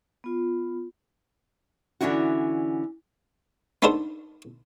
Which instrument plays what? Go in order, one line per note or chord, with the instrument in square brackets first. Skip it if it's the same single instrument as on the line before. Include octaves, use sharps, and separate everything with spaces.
[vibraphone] B3 F4
[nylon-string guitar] D3 E3 C#4 D4 E4 F#4
[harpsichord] B3 D4 D#4 A4 A#4 C5